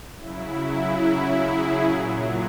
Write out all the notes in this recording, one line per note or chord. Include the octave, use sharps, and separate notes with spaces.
C#3 F#3 E4
E4
G#4
A#2 F#3